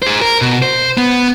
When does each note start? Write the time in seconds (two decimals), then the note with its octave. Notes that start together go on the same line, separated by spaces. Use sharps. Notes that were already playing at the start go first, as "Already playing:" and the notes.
0.02 G#4 C5
0.22 A#4
0.41 B2
0.62 C5
0.97 B3